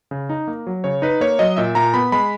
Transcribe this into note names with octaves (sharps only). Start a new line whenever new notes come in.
C#3
D#4
A#3
F#3
C#3 C#5
D#4 B4
A#3 C#5
F#3 D#5
A#2 E5
A#2 A#5
B3 B5
G#3 B5